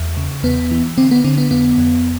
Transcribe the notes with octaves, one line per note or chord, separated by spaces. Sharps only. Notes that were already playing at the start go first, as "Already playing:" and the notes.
Already playing: E2
C#3
E2 B3
E3
D3 C4
B3
D3 C4
B3
F2 B3
F2